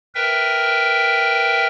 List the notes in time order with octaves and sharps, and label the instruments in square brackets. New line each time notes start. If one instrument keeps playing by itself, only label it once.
[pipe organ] A#4 B4 E5 G5